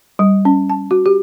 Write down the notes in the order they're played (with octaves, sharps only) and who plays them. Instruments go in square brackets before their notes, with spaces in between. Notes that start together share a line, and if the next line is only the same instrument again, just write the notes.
[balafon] G3
C#4
A5
F#4
G4